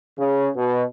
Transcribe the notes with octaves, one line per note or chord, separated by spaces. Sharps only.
C#3
B2